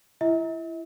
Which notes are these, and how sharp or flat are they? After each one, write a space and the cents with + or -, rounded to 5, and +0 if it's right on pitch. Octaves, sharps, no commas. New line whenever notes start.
E4 +25 E5 -45